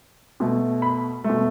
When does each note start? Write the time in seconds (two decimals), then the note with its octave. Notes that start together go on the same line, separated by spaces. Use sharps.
0.40 B2 A3
0.82 B5
1.24 A3
1.29 B2